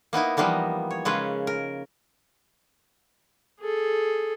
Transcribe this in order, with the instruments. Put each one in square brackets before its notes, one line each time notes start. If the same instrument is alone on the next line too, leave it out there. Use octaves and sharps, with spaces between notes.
[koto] A#3 B3 D#4 E4
E3 F3 G3 A#3 B3 D#4
C#5
C#3 G#3 A#3 C#4 B4
A#4
[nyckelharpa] G#4 A4